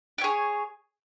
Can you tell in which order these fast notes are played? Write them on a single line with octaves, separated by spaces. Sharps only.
G4 C#5 G#4